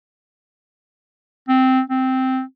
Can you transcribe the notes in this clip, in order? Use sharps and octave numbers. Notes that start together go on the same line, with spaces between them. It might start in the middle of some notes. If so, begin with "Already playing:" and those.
C4
C4